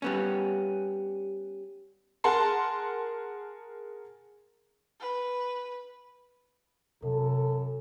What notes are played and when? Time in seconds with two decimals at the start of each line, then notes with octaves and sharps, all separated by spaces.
0.02 G3 B3 C#4
2.24 G#4 A#4 F#5 A5 C6
5.00 B4
7.02 F#2 C3 A3 A4